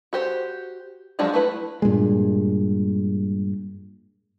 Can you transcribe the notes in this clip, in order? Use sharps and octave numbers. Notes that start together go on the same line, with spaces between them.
F#4 G4 C5
F3 F#3 G#3 D4 F4
A3 E4 B4
G2 A#2 G3 G#3